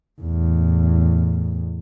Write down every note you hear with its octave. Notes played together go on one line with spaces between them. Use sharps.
E2 A2